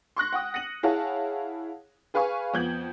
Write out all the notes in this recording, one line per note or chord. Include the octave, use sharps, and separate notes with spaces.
C6 C#6 F#6 A#6
F#5 G5 D#6
A#6 C#7 D#7 F#7
E4 G#4 C#5 F5 F#5 A5
G#4 B4 F5 G#5 C#6
F2 B3 G6 G#6 F#7